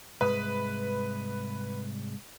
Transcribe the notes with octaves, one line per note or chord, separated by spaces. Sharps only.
C2 G#2 G#3 B4